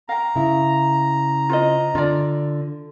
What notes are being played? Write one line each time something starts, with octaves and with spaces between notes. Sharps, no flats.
F5 G5 A#5
C#3 E4
F4 C5 D#5
D3 F4 D5